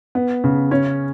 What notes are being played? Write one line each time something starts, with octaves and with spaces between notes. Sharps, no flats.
B3
C#3
C#4